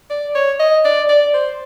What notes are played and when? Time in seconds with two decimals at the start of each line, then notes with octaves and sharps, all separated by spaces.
0.10 D5
0.35 C#5
0.60 D#5
0.85 D5
1.09 D5
1.34 C5